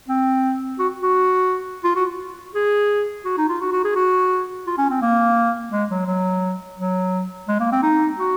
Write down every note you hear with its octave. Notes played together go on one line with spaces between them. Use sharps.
C4
F#4
F#4
F4
F#4
G#4
F#4
D#4
F4
F#4
F#4
G#4
F#4
F4
C#4
C4
A#3
G#3
F#3
F#3
F#3
G#3
A#3
C4
D#4
F#4